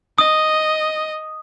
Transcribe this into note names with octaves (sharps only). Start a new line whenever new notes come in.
D#5 D#6